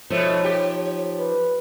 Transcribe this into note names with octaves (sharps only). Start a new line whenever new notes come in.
B2 F3 A3 D#4 C#5
G4
B4